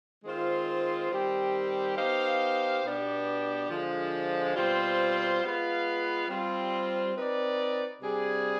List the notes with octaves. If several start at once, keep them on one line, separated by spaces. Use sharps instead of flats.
D#3 G#3 C4 F4 C5
D#3 G3 C4 G4
B3 D#4 G4 C5 F5
B2 B3 D4 G4
D3 F3 G#3
B2 G3 C4 F4 C5
G#3 B3 F4 B4 F5
G3 C4 F4
C4 D#4 B4 D5
C3 G3 D4 G#4